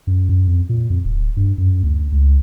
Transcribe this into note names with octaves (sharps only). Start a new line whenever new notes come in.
F#2
F#2
F2
A#2
F2
D1
G2
F#2
D2
C#2